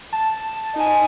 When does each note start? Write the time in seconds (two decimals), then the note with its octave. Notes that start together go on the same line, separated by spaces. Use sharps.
0.13 A5
0.75 D#4 G#5